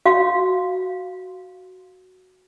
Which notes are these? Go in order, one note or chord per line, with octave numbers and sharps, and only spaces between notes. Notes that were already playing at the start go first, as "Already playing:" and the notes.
F#4 F5